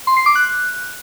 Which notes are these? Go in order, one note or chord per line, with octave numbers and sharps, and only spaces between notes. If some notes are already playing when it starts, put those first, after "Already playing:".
C6
C7
D6
F#6